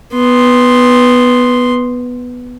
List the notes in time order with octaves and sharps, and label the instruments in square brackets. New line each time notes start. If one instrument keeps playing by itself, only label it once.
[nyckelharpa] B3 C6